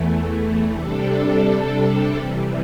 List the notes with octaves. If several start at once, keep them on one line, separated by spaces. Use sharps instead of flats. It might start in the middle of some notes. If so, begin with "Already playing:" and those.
Already playing: E2 E3 A3
C3 G3 D4 A4
C3 E3 G3